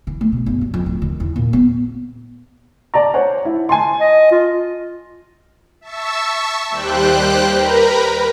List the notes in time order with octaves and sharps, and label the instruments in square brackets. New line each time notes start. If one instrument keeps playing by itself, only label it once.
[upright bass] E3
A3
B2
G1
F#3
F2
D1
D#3
E2
A#2
B3
[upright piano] D5 A5 A#5
C5 C#5 F#5
E4
G#5 A5 C6
[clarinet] D#5
F4
[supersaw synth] E5 A5 C#6 E6
D#2 G3 G4 C5 G5 F#6
A#4 B4 A#5 B5